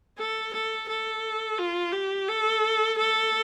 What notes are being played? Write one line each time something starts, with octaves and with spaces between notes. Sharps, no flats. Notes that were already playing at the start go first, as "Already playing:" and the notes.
A4
A4
A4
F4
G4
A4
A4